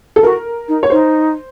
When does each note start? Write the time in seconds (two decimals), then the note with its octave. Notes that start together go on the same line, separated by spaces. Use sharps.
0.16 A4
0.23 F#4 A#4
0.68 D#4
0.83 C#5
0.90 D#4 C5